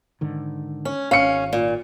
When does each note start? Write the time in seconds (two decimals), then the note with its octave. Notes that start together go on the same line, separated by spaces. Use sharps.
0.21 G#2 D3 D#3
0.85 C#4
1.11 G#1 C#4 F5 C#7
1.53 A#2